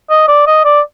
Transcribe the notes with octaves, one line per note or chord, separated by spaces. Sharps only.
D#5
D5
D#5
D5